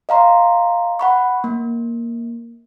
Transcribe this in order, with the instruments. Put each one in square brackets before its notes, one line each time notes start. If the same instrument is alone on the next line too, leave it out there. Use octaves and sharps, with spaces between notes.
[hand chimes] D#5 F5 A#5 C6
F#5 B5 C#6
A#3